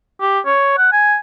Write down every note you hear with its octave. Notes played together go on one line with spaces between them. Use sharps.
G4
C#5
F#5
G#5